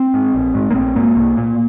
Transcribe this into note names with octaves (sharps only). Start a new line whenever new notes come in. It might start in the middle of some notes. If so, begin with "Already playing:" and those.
Already playing: C4
G#2
A#1
G#2
A#3
A#1 C4
G#2 A#3
C2
A#2